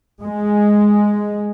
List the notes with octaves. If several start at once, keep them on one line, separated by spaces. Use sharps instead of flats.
G#3